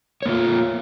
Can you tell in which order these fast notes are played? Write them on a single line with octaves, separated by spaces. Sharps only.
C#5 A#3 F4